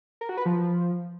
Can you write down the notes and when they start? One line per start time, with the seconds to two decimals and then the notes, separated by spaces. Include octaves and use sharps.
0.21 A#4
0.29 F#4
0.37 B4
0.46 F3